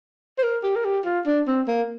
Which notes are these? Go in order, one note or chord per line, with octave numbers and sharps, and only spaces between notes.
C5
A#4
G4
A#4
G4
F4
D4
C4
A#3